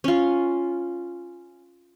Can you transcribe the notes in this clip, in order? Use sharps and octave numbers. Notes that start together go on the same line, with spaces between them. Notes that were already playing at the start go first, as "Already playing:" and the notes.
C#4 F4